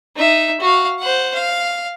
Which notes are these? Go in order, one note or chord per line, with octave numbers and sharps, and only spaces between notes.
D#4 E5
F#4 F5
C5 F#5
F5